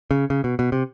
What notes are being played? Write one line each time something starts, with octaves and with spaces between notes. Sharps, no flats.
C#3
C#3
B2
B2
C3